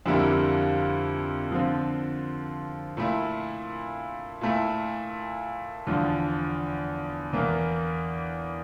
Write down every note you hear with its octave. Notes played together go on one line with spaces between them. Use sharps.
F2 D3 G3 A#3 E4
D3 F3 C4 F4
A#2 A3 E4
A#2 A3 E4
E2 D3 F3
E2 E3 A#3